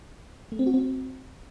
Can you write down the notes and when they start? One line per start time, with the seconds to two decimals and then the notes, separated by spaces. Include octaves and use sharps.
0.52 A3
0.59 C4
0.66 F#4
0.74 C4